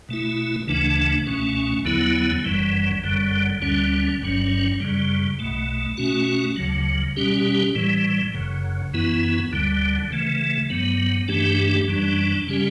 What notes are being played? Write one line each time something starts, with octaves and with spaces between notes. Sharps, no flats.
B2 A3 E4
D2 C#3 E3 A3 D4
C#2 B2 A3 C#4
E2 D3 F#3 B3 E4
F#1 F#2 E3 G3
F#1 F#2 D3 G3
D2 D3 G3 C#4
G1 G2 F#3 C#4
F#2 C#3 G3
B1 B2 A3
B2 A3 C#4 F#4
D2 C#3 F#3
B2 G3 C#4 G4
A2 E3 G3
F#1 F#2 C#3
F#2 E3 B3 E4
D2 D3 G3
C#3 E3 A3
G2 F#3 B3
G2 E3 A3 D4 G4
F#2 E3 G3 D4
C#3 G3 C#4 G4